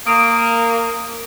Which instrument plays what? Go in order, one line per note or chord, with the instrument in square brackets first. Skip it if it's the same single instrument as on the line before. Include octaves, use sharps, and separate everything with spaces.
[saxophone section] A#3 [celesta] D#6 D7